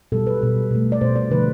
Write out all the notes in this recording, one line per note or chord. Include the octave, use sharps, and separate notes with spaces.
B2 G3 A4
B4
B2 G3
B2 A3
D5
B2 G3 C5
D5
D3 F3 A3 B4